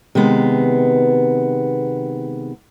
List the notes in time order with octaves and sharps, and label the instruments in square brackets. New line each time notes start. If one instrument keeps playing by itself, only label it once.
[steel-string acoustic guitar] C3 D#3 G#3 B3